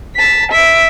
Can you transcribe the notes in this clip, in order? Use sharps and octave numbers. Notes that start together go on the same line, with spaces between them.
A5 B6
E5 D7